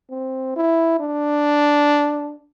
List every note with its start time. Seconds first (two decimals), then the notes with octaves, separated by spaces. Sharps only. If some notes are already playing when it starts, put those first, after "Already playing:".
0.10 C4
0.56 E4
1.00 D4